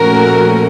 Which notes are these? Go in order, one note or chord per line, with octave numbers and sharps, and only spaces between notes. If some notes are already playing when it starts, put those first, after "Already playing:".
Already playing: A#2 F3 A3 C#4 F#4 A#4